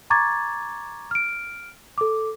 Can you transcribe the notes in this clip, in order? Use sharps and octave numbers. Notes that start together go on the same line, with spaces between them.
A#5 C#6 D6 G#6 A6
F6 D7
A4 D6